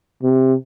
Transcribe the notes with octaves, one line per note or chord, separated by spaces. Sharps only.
C3